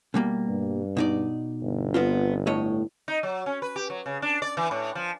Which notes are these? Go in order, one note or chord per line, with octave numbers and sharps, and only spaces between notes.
B2 G3 A#3
G2
B2 D#4 D5
G1
B3 C4 F4
A2 C#5 D#5
D#4
F#3
C#4
B4
G4
F#3
C#3
D4
D5
E3
A2
F3